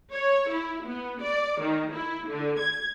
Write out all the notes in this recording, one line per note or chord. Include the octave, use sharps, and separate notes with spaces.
C#5
E4
B3
D5
D#3
E4
D3
G#6